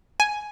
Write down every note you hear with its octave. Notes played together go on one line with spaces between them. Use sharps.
G#5